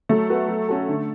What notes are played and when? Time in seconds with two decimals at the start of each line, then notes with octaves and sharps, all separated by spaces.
0.09 F#3 A3
0.29 B3 F#4 B4
0.48 F#3
0.69 C#4 F#4 A4
0.88 D3